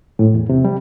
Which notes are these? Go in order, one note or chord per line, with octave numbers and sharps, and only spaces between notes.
A2
E2
C3
G3